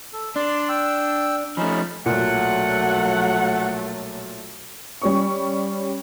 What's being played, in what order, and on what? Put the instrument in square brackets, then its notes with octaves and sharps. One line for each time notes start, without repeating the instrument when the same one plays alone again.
[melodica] A4
[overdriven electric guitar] D4 [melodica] D5 C6 D6
[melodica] G5 E6
[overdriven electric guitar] F3 A3 [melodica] C#4 D#4 B5
[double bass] B1 F#3 [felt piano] A#2 [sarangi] A3 [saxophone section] F#5
[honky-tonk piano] G3 C#4 C#6